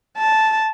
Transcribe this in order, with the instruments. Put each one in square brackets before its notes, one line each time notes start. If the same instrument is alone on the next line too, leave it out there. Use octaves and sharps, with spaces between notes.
[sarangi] A5